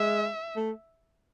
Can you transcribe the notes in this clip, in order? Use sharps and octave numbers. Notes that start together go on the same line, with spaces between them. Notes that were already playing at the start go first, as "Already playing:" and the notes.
Already playing: G#3 E5
A3